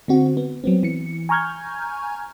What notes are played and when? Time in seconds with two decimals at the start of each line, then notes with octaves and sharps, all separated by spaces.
0.08 D3 C4 F#4
0.37 B3
0.64 F#3 B3 C4
0.83 E3 C#7
1.29 G#5 A#5 C#6 F6 G6 G#6